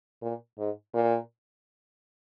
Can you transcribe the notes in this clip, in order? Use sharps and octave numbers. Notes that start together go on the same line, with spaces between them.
A#2
G#2
A#2